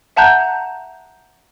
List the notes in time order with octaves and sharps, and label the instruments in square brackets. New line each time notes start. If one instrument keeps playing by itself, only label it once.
[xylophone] E5 F#5 A5 A#5 F#6 G6